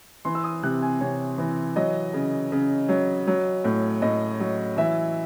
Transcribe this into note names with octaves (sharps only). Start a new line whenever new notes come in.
E3 C6
E6
D#6
C3 F#6
G#5
C3 C#5
E3
F#3 D#5
C#3
C#3
F#3
F#3
A2
A2 D#5
F#3
E3 E5